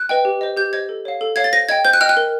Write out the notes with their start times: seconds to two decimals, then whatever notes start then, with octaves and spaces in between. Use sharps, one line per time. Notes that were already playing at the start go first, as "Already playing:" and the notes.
Already playing: F#6
0.09 B4 D#5 G5
0.25 G4
0.41 C5 D#5
0.57 G4 G6
0.73 C5 D#5 G#6
0.89 A4
1.05 C#5 F5
1.21 A4
1.36 C#5 F5 G#6
1.44 A6
1.53 C5 A#6
1.69 D#5 G5 G#6
1.85 C5 G6
1.93 F#6
2.01 D#5 G5 F6
2.09 F#6
2.17 A#4